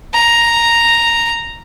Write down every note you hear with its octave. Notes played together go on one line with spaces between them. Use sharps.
A#5